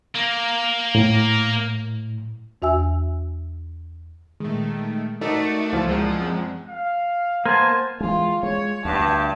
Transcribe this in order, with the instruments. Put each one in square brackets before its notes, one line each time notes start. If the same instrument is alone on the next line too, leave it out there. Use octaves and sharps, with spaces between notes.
[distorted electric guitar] A#3
[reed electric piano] A2
[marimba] E2 F#4 E5 G#5 E6
[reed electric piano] A#2 G#3 [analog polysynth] D#3 A3
[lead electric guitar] A3 [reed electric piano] D#4 A#4 [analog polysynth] F#4 D5 [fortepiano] A4 D#5
[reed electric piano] C#2 [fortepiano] E3 F3 F4
[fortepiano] A#1 F#2 [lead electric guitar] F3 [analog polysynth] G#3
[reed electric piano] C4
[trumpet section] F5
[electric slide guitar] A#3 [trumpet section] B3 A5 [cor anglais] C5 [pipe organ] G#5
[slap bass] E3 G#3 [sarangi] F4
[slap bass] G#3 [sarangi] C#5
[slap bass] D2 [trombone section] G2 [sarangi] A5